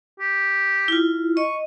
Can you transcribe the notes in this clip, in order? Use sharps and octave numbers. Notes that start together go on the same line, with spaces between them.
G4
E4 F4
D#5 C#6